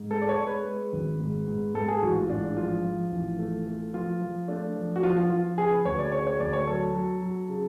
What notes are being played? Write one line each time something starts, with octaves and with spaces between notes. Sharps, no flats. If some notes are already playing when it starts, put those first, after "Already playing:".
Already playing: G#2
G#3 A4
D5
C#5
G#3
B4
G#3
G#1
G#2
G#2
G#2 A4
G#4
A1 F#4
F4
G#2 D4
F3 F4
F3
A1
A3
A3
F3 F4
F3
A3 D4
F3
F#4
F3 F4
F4
F3 F4
C#3 G#4
B4
D2 C#5
D5
C#3 C#5
C#5
D2 D5
C#5
F#3 A4
F#3
F#3
C#3